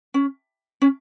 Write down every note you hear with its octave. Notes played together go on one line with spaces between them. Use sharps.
C#4
C#4